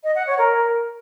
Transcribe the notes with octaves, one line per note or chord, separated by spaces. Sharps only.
D#5
F#5
C#5
A#4